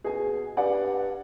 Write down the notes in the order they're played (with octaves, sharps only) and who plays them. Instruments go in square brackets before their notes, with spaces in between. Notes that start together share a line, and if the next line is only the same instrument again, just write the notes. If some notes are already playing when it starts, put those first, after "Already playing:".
[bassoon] B2 [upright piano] G#4 G#5
[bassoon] G2 [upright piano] D5 F#5